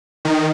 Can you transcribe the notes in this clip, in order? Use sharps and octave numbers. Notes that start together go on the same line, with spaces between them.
D#3